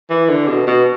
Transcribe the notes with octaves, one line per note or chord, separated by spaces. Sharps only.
E3
D3
B2
B2